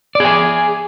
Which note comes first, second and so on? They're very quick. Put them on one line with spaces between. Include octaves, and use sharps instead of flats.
D5 G#4 G#5